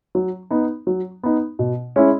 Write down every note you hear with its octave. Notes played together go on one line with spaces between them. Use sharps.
F#3
B3 D#4
F#3
B3 D#4
B2
G#3 C#4 E4